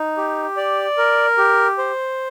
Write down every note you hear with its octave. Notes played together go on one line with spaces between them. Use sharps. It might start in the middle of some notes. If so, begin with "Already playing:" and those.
Already playing: D#4
G4
D5
A#4
G4
C5